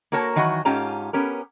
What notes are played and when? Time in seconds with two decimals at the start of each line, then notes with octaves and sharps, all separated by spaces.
0.12 A#3 F#4 A#4 C#5 A5
0.36 D#3 E3 F#3 F#4 G#5
0.65 G#2 C#4 F4 G4 A5 A#5
1.13 B3 C#4 G4 A#4